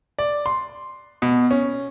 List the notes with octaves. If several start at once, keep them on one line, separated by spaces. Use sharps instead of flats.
D5
C6
B2
C#4